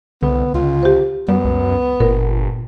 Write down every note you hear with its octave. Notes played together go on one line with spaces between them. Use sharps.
C2 D3 B3
C#2 F4
G4 C5
F#2 G3 B3
C#2
G1 A#2 A#4